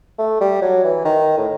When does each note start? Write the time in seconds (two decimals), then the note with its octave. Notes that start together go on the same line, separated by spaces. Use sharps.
0.19 A3
0.40 G3
0.62 F#3
0.84 E3
1.05 D#3
1.38 A2